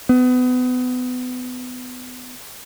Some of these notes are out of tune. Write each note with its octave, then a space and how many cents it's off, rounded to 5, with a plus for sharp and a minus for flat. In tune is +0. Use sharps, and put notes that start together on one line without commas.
B3 +30